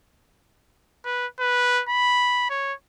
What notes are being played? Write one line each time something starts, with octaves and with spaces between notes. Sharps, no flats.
B4
B4
B5
C#5